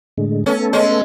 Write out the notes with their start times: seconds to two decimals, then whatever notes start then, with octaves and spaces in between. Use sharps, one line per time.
0.18 A2 D3 G#3
0.46 A3 B3 C#4 A4
0.73 G#3 C#4